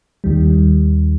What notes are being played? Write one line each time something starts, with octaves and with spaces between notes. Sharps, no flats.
D#2 D#3 G3